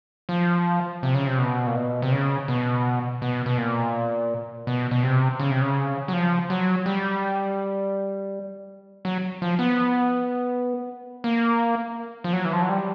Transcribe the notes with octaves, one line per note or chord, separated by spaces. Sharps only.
F3
C3
C#3
C3
B2
A#2
B2
C3
C#3
B2
B2
B2
A#2
B2
B2
C3
C#3
C3
C#3
F#3
F3
F#3
G3
F#3
F3
B3
A#3
F3
F#3
E3
F3
F#3
G3